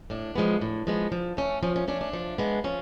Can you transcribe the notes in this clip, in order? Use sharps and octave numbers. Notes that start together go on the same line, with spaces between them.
A2 D4
F3 G#3 B3
A2
F3 G#3 B3
F3
A3 C#4
F3 C#4
C#4
A3 C#4 D4
D4
F3
G#3 B3
F3 C#4